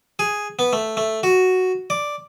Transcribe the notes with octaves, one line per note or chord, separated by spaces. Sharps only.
G#4
B3
A3
A3
F#4
D5